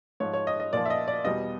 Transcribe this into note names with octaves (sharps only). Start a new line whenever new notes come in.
G#2 F3 C#5
C#5
D#5
D#5
A#2 F3 D5
E5
D#5
D5
E2 B2 G3 D#5